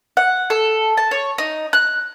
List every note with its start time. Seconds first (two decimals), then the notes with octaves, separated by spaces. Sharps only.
0.17 F#5
0.50 A4
0.97 A5
1.11 C#5
1.38 D#4
1.73 F#6